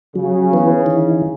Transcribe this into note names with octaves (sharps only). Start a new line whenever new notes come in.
C#3 F#3
E3 B3
D#3 E3